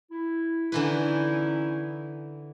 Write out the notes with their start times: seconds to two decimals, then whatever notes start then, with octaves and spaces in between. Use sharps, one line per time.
0.11 E4
0.72 D3 E3 C#4 D#4 E4 B4